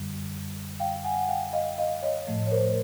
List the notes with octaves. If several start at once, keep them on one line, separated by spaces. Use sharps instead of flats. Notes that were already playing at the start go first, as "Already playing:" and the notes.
Already playing: F#2 D3 G3
F5 G5
F#5 G#5
F5 G5
D#5 F5
D#5 F5
C#5 D#5
A2 F3 A3
C#5
A#4 C5